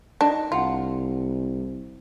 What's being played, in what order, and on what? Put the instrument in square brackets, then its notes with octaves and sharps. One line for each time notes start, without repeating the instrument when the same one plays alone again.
[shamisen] D4 [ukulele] D#4 D#5 A5
[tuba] C2 [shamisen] F4 [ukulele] F5 F#5